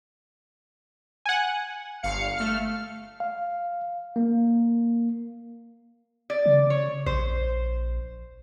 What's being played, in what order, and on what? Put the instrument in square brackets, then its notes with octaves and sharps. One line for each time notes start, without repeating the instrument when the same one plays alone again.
[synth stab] F#5 G#5
[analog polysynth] G1 F5 C#7
A3 F6
[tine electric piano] F5
A#3
[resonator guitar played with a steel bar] D5
[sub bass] C#3
[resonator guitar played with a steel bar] C#5
[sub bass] A#1 [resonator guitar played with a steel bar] C5